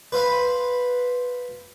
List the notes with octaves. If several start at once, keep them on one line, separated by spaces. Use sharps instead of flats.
B4 C5 F5 B5